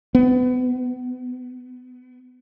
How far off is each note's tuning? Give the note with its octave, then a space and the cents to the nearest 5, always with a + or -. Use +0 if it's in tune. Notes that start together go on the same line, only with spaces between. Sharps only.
B3 +25